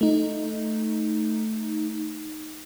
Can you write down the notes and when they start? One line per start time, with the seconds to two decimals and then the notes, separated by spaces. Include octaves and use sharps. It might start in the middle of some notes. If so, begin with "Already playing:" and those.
0.01 A3 D#4